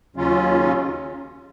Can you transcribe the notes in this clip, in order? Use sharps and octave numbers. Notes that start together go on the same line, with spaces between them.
D#2 C#3 F#3 C#4 F4